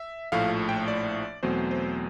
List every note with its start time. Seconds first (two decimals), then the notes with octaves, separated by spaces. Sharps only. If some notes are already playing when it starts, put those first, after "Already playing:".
Already playing: E5
0.32 A#1 A2 F3 A3 F5
0.69 G5
0.88 D5
1.43 E2 B2 F#3 A3 C4 C5
1.71 C5